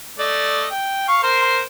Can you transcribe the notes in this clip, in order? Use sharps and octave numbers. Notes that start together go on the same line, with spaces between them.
A3 D5 D#5
G5
F5 C#6
A#4 C5 C6